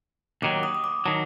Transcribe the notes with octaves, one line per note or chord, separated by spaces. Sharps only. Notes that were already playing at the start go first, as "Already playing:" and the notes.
D#2 D#3 F#3 D6
D#6
D#6
D6
D#3 F#3 A5